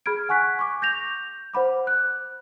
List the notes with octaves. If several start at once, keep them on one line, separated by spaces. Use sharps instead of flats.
G#4 B5 F6 G#6 D7
F#5 G#5 C#6 F#6 B6
C#6 D6
G6 A#6 F7
C5 F#5 B5 D6
F#6